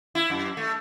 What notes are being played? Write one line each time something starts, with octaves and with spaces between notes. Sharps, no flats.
E4
F#2
A3